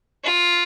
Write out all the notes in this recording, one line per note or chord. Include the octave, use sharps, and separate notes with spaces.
F4